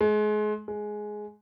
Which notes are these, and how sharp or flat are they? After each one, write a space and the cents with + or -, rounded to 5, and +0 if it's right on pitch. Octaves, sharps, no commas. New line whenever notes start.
G#3 +30
G#3 +10